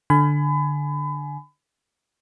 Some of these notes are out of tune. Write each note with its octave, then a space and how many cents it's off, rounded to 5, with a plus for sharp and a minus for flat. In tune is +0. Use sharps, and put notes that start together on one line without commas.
D3 +0 G#5 +20 B5 +30